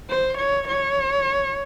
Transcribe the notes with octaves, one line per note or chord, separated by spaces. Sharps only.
C5
C#5
C#5